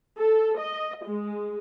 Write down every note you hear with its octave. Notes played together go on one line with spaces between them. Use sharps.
A4
D#5
G#3